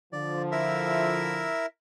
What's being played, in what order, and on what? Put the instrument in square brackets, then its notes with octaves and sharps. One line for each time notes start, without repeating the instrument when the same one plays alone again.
[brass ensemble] D3 F3 [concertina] D5
[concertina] E4 A#4 E5